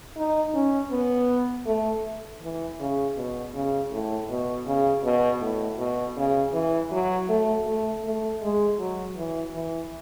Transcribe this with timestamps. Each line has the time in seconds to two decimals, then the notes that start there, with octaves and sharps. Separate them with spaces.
0.17 D#4
0.54 C#4
0.91 B3
1.67 A3
2.42 E3
2.80 C#3
3.17 B2
3.54 C#3
3.92 A2
4.29 B2
4.66 C#3
5.04 B2
5.41 A2
5.79 B2
6.17 C#3
6.54 E3
6.92 F#3
7.29 A3
7.67 A3
8.04 A3
8.42 G#3
8.79 F#3
9.17 E3
9.54 E3